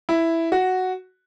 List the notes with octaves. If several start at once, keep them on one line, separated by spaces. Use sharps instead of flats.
E4
F#4